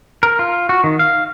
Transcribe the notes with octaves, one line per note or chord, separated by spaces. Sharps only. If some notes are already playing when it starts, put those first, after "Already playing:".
A#4
F4
F#4
D#3
F5